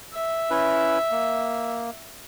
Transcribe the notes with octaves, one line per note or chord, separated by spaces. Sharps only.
E5
C#4 E4 B4
A#3